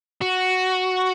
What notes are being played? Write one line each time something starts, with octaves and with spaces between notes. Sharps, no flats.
F#4